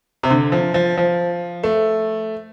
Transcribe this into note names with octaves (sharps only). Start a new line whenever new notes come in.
C3
D3
F3
F3
F3
A3